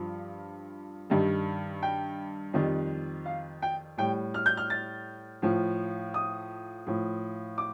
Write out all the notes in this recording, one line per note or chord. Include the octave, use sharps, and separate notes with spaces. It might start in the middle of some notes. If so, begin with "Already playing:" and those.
Already playing: G2 F3
G2 D#3 G3
G5
F2 D#3 G3
F5
G5
A2 G3 G5
F6
G6
F6
A6
A2 F3
D#6
A2 F3
D6